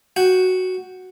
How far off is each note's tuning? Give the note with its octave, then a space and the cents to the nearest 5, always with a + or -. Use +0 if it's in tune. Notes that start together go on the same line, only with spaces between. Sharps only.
F#4 +0 G5 +0